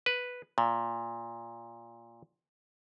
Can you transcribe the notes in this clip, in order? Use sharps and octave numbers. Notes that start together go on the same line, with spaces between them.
B4
A#2